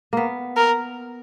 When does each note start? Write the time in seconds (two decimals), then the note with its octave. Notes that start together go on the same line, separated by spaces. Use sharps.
0.13 A#3 B3
0.57 A#4